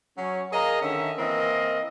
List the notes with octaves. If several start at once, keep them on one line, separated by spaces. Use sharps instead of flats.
F#3 C#4
G#4 A#4 D#5 F5 A#5
D3 D#3 C#4 E5
E3 A#3 C4 A#4 D#5